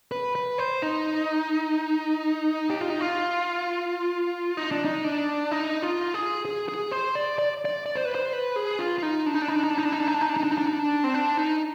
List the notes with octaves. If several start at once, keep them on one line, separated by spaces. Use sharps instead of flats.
B4
B4
C5
D#4
G4
F4
D#4
F4
D#4
D4
D#4
D4
D#4
F4
G#4
G#4
G#4
C5
D5
D5
D5
D5
C5
B4
C5
B4
G#4
F4
F4
D#4
D4
D#4
D4
D#4
D4
D#4
D4
D#4
D4
D#4
D4
D#4
D4
D#4
D4
D#4
D4
D#4
D4
D#4
D4
C4
D4
D#4